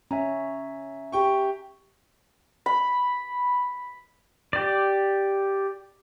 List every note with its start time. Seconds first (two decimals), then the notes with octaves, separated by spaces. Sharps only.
0.11 C#4 E5 G#5 A#5
1.12 G4 G5 C#6
2.66 B5
4.53 G4 D5